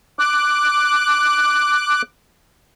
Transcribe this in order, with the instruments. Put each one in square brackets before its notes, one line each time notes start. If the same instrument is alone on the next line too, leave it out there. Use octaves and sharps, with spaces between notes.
[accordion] D6 F#6